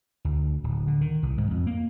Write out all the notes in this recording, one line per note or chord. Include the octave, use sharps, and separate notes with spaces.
D2
D1
D3
D#3
C2
G#2
F2
A#3